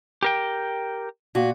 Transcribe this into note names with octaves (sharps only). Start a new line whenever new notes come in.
G4 A#4 G5
A#2 F#4